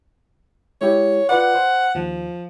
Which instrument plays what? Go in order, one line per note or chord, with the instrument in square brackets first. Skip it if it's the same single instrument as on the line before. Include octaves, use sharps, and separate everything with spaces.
[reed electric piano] G#3 E4 G4 [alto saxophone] C#5
[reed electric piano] F4 B4 D5 [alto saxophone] F#5
[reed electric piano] C5
[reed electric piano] D#2 [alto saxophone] F3